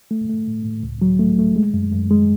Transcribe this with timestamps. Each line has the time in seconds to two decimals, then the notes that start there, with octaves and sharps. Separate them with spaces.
0.11 A3
0.29 A3
0.47 A2
0.65 A2
0.83 C#2
1.02 F#3
1.19 A3
1.39 A3
1.56 G#3
1.74 F#2
1.92 F#2
2.11 G#3